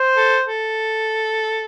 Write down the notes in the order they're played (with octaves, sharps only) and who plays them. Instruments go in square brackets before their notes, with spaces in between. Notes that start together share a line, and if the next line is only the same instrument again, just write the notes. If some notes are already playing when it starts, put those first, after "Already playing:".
Already playing: [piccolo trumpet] C5
[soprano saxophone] A4
A4